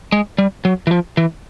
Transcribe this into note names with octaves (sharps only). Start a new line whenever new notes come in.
G#3
G3
F#3
E3
F3
E3